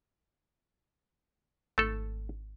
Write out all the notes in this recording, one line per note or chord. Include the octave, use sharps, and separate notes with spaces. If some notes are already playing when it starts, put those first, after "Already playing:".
G#1 A3 A4